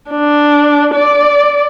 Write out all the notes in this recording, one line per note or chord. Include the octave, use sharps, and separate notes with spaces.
D4
D5